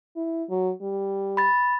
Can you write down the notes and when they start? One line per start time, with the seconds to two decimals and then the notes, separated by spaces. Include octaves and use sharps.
0.16 E4
0.50 F#3
0.82 G3
1.37 B5 A6